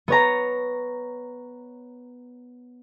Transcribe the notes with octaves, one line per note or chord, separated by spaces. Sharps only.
B3 C#5 A#5